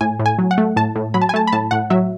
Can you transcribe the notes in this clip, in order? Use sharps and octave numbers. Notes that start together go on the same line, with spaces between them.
A2 G#5
A2
G#5
F#3
F#5
A3
A2 A5
A2
F#3 B5
A5
G#5
A3 A5
B5
A2 A5
A2 F#5
F#3 E5